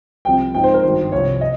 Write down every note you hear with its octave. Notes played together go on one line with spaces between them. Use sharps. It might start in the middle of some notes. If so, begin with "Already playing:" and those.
C2 C3 F3 C4 G5
G#2 F3 C4 D#4 G5
C5
A#4
G#1 G2 D#3 C5
C2 C3 F3 C#5
D#5